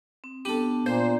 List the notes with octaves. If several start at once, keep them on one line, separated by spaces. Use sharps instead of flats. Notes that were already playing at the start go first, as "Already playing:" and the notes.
C4
B3 D4 G4 A4
A#2 A#3 C5